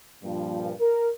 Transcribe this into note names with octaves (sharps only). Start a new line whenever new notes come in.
G2 A#2 F3
A#4